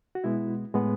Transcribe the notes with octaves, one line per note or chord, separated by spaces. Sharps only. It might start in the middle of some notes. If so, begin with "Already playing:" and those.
F#4
B2 G#3 B3 E4
A2 G#3 B3